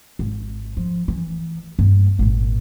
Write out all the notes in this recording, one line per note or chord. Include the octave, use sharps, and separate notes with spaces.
G#1
F3
E3
G2 A#3
G#1 A#2